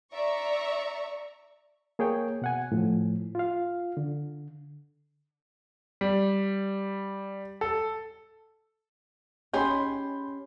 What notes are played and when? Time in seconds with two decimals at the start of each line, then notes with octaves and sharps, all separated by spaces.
0.13 D5 E5 A#5 C#6
1.99 A#3 G#4 C#5 G5
2.42 B2 F#5 G#5
2.72 A2 F3
3.35 F4 F5
3.97 D3
6.01 G3
7.61 A4
9.54 C#4 D#4 G4 G#4 B5 C6 G6